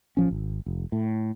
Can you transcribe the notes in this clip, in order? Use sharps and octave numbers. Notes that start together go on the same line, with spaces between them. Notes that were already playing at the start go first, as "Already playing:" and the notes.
A1 F3 C#4
G#1
F1
A2